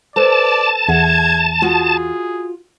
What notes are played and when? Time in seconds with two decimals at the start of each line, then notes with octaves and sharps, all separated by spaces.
0.16 A4 B4 C5 D5 A5
0.88 E2 G#4 E5 F#5 G#6
1.62 F4 F#4 G#4